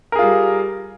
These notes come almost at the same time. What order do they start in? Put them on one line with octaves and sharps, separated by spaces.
A#4 G#4 F4 G3